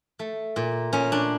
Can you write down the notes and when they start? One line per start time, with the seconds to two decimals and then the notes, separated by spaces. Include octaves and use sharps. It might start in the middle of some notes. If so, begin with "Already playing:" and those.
0.19 A3
0.56 A#2
0.93 A#2 C#4
1.12 D4